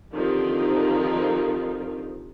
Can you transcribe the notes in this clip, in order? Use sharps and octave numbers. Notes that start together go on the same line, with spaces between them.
D3 D#3 F3 C4 D#4 G4